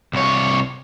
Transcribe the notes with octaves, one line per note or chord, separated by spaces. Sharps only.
C2 C#5